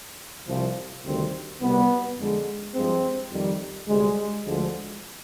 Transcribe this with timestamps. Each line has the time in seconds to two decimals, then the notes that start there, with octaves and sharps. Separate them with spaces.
0.47 C2 C3 F3
1.04 D2 C3 D#3 G3 C4
1.61 C2 B2 G3 B3
2.18 F2 D3 G#3
2.74 G2 F3 G#3 C4
3.31 F2 D#3 G3
3.88 D2 C3 G3 G#3
4.45 D2 D3 F3 G#3